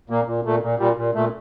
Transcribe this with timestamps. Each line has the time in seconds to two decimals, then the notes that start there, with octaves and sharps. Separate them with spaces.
0.10 A#2 A#3
0.27 A#2
0.45 A#2 A3
0.62 A#2
0.79 A#2 G3
0.96 A#2
1.15 A#2 A3